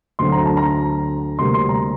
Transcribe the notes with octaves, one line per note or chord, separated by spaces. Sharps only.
D2 D3 F#3 A3 C4 C6
A#5
A5
A#5
D2 C3 G3 A#3 C6
C6
A#5